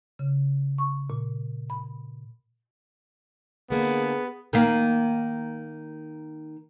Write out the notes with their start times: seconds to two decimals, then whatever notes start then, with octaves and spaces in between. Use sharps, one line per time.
0.19 C#3
0.78 C#6
1.10 A#2
1.70 B5
3.70 D3 A#3 B3 G#4
4.53 D#3 A#3